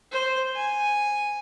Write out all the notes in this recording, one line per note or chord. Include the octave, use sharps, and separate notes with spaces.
C5
G#5